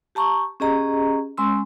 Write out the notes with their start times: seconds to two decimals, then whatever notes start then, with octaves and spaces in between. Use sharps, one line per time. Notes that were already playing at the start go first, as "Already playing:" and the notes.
0.15 G4 A5 A#5 C#6
0.60 C#4 G4 G#4 D#5 A#5
1.38 G#3 C#4 C6 E6